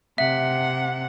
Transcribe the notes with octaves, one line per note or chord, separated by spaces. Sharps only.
C3 E5 F#5